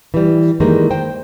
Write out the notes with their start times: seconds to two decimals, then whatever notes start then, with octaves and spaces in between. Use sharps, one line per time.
0.14 E3 G3
0.60 D#3 E3 G3 G#3 A#3 D#4
0.91 C5 G5